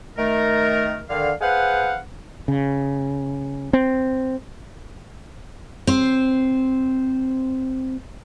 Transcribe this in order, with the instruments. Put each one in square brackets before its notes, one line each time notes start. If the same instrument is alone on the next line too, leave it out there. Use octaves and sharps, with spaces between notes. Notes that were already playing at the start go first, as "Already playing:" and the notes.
[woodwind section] D#3 A3 A#4
D3 D#3 F5
G#4 B4 C5 F5 F#5
[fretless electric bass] C#3
C4
[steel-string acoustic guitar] C4 C5